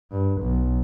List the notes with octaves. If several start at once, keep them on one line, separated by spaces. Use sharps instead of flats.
G2
B1